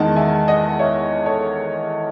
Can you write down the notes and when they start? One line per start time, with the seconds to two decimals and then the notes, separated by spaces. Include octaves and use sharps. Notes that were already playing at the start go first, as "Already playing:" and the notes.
Already playing: E2 D#3 G#3 D#4 F#5 A5
0.16 E5 G#5
0.48 D#5 F#5
0.79 C#5 E5
1.26 A4 C#5